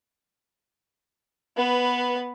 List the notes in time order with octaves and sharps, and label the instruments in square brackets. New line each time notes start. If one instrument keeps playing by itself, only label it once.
[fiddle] B3 B4